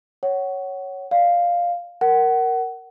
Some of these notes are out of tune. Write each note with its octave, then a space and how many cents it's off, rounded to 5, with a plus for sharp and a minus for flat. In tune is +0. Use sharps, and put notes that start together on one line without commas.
C#5 +0 F#5 +20
D5 +0 F5 +0
A#4 +0 F#5 +25